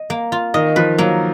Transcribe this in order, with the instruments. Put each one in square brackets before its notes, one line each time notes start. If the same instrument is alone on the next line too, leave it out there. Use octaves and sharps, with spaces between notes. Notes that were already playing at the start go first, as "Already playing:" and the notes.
Already playing: [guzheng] D#5
A#3
F4
[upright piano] D#3 [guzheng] D#5
[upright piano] F3 [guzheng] B4
[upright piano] F#3 [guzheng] A#3